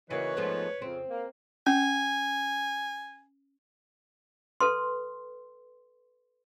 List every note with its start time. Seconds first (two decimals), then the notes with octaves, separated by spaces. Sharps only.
0.11 C#3 E3 A#3 D#4 F#4 B4 C#5
0.37 G#2 F3 A3 B3
0.82 F2 C#3 C4
1.10 A#3
1.67 C#4 G#5
4.61 A4 B4 C6